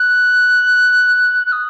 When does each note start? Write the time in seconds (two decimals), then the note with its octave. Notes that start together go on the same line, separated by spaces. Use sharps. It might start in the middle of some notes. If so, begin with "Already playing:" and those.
Already playing: F#6
1.47 F#6
1.52 D#6